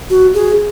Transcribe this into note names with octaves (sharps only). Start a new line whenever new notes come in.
F#4
G#4